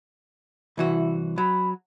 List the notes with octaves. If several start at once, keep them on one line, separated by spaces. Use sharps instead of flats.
C2 E3 E4 F#4
F#3 B5